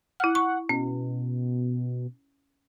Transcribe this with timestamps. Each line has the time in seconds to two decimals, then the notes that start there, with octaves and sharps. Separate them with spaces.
0.20 E4 F#5 F6
0.35 C#6
0.69 B2 C#4